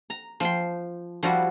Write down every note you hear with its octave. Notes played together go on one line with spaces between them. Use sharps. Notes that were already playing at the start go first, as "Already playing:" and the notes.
A#5
F3 G5 C6
F3 G3 E4 F#4